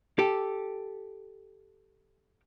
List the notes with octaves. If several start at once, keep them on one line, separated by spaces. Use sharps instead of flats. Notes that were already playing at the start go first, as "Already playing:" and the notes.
G4 A4